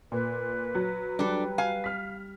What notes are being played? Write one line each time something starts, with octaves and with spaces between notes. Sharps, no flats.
A#2 B4
F#3
G3 D4 A4
F5 G#5
F6 B6